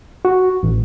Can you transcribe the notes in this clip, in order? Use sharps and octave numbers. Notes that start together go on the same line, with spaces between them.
F#4
A1